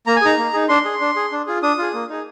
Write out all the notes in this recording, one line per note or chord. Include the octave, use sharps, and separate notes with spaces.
A#3 A#5
G#5
D#4 G#4 A#5
A#3
D#4 G#4
D4 C6
G#4
D4
G#4
D4
F4 G#4
D4 D#6
F4 G#4
A#3
D#4 G#4